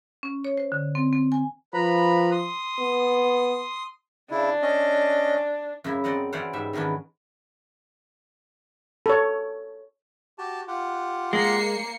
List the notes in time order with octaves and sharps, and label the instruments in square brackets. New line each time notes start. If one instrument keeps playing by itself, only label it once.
[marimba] C#4
C#5
C5
D3
C4
C4
G#5
[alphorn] F3 [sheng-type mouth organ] B4 A#5 B5
[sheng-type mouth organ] C6 D#6
[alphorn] B3
[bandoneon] C#3 E4 [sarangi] D4
[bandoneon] C#4 D#5
[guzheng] F#2 C#3 E4
C4 D5 D#5 F#5 A#5
E3 C#4 C5 D5 F5 F#5
G#2 G3 E5
D#3 E3 B3 C#4 D4
[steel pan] A4 C#5
[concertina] F#4 G4 A5
F4 G4 F#5
[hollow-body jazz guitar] G#3 [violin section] A#3 C7 C#7